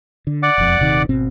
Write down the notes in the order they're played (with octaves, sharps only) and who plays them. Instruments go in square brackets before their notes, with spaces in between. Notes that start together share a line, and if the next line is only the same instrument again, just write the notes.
[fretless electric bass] D3
[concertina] D5 F#5 D6
[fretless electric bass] E1 F2
D#1 C3 D#3
G#1 B2 C4